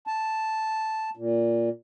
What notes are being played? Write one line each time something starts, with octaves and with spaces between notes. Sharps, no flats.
A5
A#2